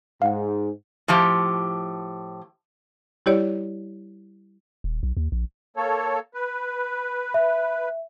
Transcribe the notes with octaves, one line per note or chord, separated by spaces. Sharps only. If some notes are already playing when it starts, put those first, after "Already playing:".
G#2 F5 F#5
A2 F3 G4
G3 E4 G4 C#5 D5
D#1
B1
D#2
A#1
A#3 A4 C#5
B4
E5